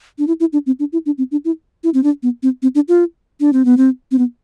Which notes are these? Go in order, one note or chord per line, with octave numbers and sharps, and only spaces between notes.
D4
E4
E4
D4
C4
D4
E4
D4
C4
D4
E4
E4
C4
D4
B3
C4
C4
D4
F4
D4
C4
B3
C4
C4
B3